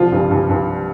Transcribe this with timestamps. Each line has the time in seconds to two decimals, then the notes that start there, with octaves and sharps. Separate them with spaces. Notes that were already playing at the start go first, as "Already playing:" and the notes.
Already playing: C2 F3 F4
0.12 G2
0.31 G2
0.50 G2